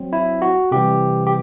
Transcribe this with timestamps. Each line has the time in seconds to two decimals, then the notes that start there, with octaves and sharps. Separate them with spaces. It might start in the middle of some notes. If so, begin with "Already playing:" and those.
Already playing: F#3 C4
0.13 E4
0.42 F#4
0.71 C3 E3 G3 G4
1.27 G4